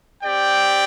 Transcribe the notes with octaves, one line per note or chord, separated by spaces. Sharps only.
C4 G4 D5 G5